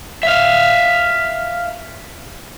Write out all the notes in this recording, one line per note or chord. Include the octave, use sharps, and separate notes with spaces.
E5 F5